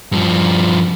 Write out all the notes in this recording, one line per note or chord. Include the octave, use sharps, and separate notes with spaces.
G2 F3